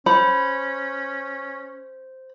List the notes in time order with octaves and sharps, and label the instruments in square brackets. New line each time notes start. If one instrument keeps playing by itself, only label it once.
[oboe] C#4 [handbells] C5 [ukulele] B5